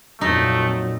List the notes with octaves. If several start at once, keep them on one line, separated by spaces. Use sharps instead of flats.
F2 A#2 F#3 A3 D#4